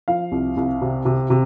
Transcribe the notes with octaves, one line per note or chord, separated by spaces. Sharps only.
F3 F5
C2
C2
C3
C3
C3